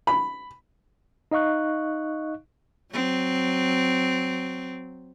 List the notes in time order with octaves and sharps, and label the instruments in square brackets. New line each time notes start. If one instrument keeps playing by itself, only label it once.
[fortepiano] B5
[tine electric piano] D#4 D#5 F5 C#6 F#6
[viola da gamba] F#3 C4